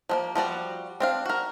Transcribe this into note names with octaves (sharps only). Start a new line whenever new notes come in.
F3 G#3 A#3
F3 G3 F#4 D5
C4 D4 F5
F#4 A#4